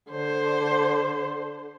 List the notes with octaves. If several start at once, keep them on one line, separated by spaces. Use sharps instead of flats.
D3 C5